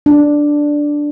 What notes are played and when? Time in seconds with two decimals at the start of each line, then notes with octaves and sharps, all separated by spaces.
0.06 D4